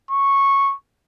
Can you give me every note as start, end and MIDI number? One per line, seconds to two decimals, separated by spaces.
0.11 0.74 85